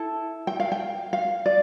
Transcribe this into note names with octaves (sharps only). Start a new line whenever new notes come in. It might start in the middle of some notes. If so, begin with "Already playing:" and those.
Already playing: E4 A4 A5
G5
F5
G5
F5
D5